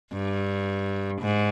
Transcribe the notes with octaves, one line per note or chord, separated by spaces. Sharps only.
G2
G#2